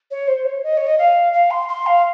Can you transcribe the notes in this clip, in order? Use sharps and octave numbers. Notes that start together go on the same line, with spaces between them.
C#5
C5
C#5
D#5
C#5
D#5
F5
F5
C6
C6
F5